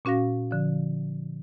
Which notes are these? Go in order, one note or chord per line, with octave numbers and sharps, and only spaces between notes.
A#2 C#4 F#4 F5 A#6
D3 F3